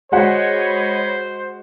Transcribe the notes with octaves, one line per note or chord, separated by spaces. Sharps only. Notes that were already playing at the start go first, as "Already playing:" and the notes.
G#3 F#4 C5 C#5 D#5 F#5 B5